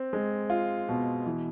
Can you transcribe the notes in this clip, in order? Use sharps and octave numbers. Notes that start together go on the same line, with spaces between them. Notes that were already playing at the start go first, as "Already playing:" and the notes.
Already playing: C4
G#3
F4
B2
E3